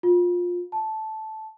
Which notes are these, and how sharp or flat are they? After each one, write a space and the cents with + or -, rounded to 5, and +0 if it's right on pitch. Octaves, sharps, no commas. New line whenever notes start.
F4 +20
A5 -10